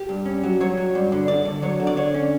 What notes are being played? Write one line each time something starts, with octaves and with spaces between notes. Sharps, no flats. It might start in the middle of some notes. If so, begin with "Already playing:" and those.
Already playing: G4
G2
C#4
F#3
F#3 C#5
F#3
G2
D3
D3 D5
D3
F#3 C#5
D3
D5
D3 C#5
C#4